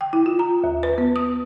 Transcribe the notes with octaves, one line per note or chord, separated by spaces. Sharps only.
G5
E4
F4
A#5
D#2
B4
B3
D#6